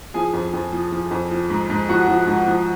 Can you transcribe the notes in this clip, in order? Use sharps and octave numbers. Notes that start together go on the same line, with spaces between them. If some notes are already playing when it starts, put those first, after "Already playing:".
F3 G#4 G#5
F2
F2
F3
F3
F2
F3
G#2
G#2
F3 F#4 F#5
F3
G#2
F3